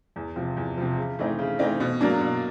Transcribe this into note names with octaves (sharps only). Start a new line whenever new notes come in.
E2
C3 F3
E2
C3 F3
C#3
E3 A3 C4 D#4
C#3
E3 A3 C4 D#4
B2
F#3 A#3 D4
B2